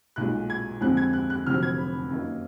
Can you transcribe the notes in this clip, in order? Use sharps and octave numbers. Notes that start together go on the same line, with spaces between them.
B1 A#2 G#3 F#6
G#6
F2 D3 G#3 F#6
G#6
F#6
F#6
F1 F2 D3 F#3 F6
G#6
B5
F#2 D#3 A#3 D#4